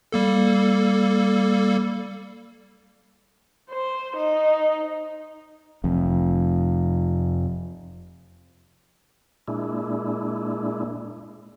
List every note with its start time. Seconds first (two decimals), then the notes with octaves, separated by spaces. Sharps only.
0.12 G3 A#3 A4
3.71 C5
4.17 D#4
5.84 F1 F2
9.48 A#2 G#3 D4 E4